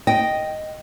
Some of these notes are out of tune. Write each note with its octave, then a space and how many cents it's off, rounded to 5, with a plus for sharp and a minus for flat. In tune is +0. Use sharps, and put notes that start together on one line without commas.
D#5 +0 G5 -5